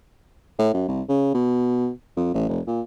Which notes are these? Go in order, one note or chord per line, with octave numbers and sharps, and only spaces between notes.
A2
F#2
C2
C#3
B2
F2
A1
F1
A#2